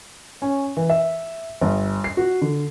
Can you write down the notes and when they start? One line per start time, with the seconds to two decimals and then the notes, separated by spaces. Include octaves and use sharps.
0.42 C#4
0.77 E3
0.90 E5
1.61 G1
2.04 C7
2.17 F#4
2.41 D3